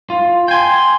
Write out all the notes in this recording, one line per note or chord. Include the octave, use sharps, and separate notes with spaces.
F4
G5 G#5 C6